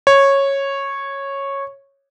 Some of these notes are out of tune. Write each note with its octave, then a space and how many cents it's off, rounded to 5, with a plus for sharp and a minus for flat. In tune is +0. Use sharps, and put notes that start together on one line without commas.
C#5 -10